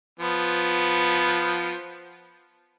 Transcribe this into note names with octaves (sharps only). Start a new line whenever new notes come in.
F3 B3